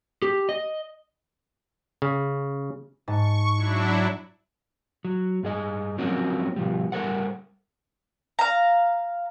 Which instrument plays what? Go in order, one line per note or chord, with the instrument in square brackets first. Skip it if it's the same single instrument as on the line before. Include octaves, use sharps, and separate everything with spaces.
[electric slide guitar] G4
D#5
[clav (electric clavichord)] C#3
[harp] G#2 A5 [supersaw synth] C#6
[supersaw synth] F#3 D4 E4
[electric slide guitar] F#3
G2 G#4 D#5
F3 F#3 A#3 C4 C#4 F#4
B2 F3 G3
G3 A4 A#4 C5 F#5
[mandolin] F5 A#5